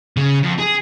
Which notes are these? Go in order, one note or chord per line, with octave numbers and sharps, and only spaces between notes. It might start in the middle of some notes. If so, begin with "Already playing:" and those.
C#3
F2
G#4